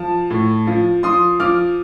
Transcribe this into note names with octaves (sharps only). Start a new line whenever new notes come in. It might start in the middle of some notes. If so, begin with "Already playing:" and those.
Already playing: F3 A5
A2
F3
F3 C6 D#6
F3 D6 F6